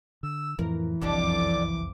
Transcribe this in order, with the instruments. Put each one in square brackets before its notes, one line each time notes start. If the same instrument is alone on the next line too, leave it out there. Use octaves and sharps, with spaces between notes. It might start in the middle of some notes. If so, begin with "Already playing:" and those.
[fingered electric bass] D3 [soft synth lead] E6
[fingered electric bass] F2 A2 F3 [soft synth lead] E3 [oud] A#4
[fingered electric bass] F#1 C2 [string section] F2 D6 [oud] D3 G3 D4